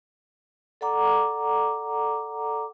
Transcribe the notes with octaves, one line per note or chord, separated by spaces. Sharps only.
A4 D5 F#5 A#5 D6